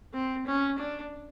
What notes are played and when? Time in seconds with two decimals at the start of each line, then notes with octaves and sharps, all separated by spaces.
0.14 C4
0.47 C#4
0.79 D4